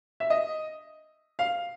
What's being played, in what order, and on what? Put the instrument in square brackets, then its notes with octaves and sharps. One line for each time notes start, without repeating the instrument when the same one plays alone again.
[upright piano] E5
D#5
F5